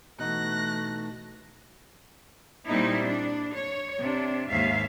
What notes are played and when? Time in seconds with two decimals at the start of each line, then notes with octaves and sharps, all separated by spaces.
0.19 B2 E3 A3 D#4 F#4 F#6 A#6
2.66 A#2 G3 C4 D#4 E4
3.05 D4
3.56 C#5
4.00 C3 D4
4.49 D#2 G#2 E5 F5